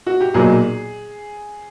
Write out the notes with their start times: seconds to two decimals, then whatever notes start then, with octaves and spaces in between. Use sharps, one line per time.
0.07 F#4
0.21 G4
0.34 B1 A#2 F#3 G#4